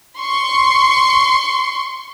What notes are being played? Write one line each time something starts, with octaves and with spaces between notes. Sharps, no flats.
C6 C#6